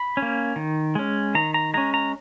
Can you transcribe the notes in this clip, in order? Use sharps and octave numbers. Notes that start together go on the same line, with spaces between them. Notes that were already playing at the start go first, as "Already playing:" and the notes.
Already playing: B5
C#4
A#3
D#3
G#3 C#4
D#3 A#5
A#5
G#3 C#4 A#5
A#5